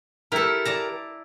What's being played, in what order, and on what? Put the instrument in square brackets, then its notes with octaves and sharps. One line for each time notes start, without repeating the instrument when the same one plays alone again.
[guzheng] E4 A4 [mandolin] G4 A#4
[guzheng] D5 A5 A#5